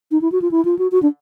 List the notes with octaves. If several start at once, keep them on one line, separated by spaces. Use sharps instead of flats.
D#4
E4
F#4
F4
E4
F4
F#4
F#4
D4